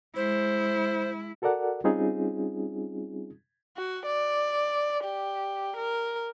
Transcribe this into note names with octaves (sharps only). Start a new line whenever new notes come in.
G#3 E4 C5
F#4 A4 A#4 D5 F#5
G3 C4 C#4 D#4 F4 G#4
F#4
D5
G4
A#4